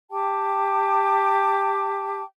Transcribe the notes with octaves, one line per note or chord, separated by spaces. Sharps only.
G4 G5 A5 D6